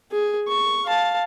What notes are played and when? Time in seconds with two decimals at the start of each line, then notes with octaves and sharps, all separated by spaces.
0.11 G#4
0.48 C#6
0.86 F5 A5